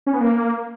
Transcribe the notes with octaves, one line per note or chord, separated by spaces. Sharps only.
C#4
B3
A#3